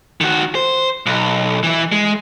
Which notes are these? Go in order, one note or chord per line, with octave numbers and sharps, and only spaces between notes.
D#3 F#4
C5
B1
E3 E4
G#3